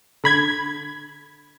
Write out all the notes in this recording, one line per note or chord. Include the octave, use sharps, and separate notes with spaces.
D3 B5 G#6